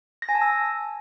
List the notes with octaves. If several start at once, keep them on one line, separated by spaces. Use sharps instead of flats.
A#6
G#5
A5
E6